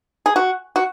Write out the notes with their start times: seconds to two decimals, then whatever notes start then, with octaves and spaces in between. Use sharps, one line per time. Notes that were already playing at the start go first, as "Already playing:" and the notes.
0.26 G#4
0.36 F#4
0.76 F#4